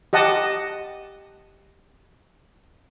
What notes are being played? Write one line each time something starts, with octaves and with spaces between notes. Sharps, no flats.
G4 D#5 F#5 A5